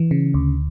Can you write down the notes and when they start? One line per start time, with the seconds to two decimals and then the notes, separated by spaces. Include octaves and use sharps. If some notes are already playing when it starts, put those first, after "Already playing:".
Already playing: E3
0.11 C#3
0.34 D2